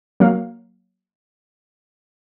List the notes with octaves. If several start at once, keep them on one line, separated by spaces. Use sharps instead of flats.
F#3 A#3 F5